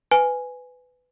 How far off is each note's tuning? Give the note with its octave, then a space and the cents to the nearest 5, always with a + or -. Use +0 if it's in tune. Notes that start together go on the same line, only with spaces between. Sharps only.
B4 +15 G#5 +0